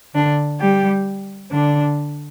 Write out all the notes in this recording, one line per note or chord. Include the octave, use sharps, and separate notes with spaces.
D3 D4
G3 G4
D3 D4